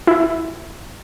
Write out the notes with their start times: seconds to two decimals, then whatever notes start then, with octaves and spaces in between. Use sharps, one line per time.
0.07 E4